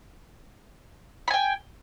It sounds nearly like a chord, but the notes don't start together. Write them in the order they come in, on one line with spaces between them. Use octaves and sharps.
B5 G#5 G5